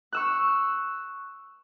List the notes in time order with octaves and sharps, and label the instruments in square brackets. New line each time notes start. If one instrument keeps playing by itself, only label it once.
[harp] C#6 E6 F#6